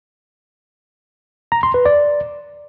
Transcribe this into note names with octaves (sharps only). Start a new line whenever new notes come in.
A#5
C6
B4
D5